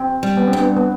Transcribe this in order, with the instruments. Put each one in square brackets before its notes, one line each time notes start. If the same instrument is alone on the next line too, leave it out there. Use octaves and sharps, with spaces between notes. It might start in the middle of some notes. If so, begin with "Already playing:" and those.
Already playing: [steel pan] C4
[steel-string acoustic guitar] G3
[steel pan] B3
C4
[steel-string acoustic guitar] G2
[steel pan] B3
B3